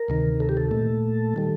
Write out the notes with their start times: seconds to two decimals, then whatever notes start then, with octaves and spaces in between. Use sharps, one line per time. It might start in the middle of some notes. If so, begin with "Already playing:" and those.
Already playing: A#4
0.08 D2 C3 D#3
0.40 A4
0.49 G4
0.57 A4
0.71 A#2 A3
1.36 D#3 G3